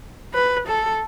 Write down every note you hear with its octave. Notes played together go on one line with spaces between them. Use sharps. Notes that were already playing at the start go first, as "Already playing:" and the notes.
B4
A4